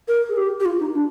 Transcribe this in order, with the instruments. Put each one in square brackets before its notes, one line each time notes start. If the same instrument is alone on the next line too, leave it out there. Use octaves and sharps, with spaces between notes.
[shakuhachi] A#4
G#4
G4
G4
F4
D#4
D4